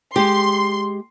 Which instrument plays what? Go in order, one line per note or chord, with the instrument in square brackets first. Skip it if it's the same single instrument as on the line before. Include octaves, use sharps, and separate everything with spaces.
[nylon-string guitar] G#3 G4 [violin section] C6